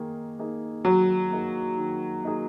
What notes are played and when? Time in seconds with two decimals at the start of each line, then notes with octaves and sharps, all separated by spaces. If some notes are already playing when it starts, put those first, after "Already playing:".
Already playing: D#3 A#3 D#4 G#4
0.39 A#3 D#4 G#4
0.85 D#3 F#3
1.31 A#3 D#4 G#4
1.77 D#3
2.23 A#3 D#4 G#4